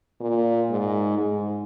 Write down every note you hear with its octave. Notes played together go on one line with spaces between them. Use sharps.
A#2
G#2
G#2